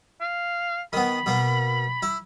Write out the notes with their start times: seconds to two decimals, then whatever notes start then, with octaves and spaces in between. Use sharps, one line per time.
0.21 F5
0.93 D#3 B3 B5
1.26 B2 A#3
2.02 E4